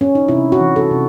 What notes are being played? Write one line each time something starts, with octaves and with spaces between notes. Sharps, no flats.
C#4
D#4
C3 E4
F#4
E3
A4
C3